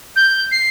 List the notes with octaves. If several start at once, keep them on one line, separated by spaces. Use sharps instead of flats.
G6
C7